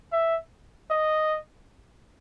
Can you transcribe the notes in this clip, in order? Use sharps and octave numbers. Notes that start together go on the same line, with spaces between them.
E5
D#5